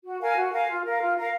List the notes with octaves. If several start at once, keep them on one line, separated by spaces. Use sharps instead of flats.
F#4
A#4 F5 G#5
F#4
A#4 F5 G#5
F4
A#4 F5
F4
A#4 F5